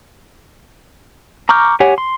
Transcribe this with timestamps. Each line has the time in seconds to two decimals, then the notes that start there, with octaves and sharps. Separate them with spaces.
1.49 A#5 C#6 D6 F6 G6
1.80 G4 C#5 F#5 G#5
1.98 C6